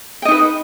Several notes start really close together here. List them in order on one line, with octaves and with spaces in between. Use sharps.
G5 D#5 D#4 B4